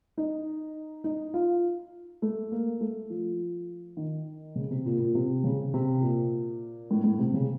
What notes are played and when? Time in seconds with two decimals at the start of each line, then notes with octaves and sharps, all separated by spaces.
0.17 D#4
1.04 D#4
1.34 F4
2.22 A3
2.52 A#3
2.81 A3
3.10 F3
3.97 D#3
4.56 C#3
4.70 C3
4.86 A#2
4.99 A#2
5.15 C3
5.44 C#3
5.74 C3
6.02 A#2
6.91 A2
7.04 A2
7.19 C3
7.34 C#3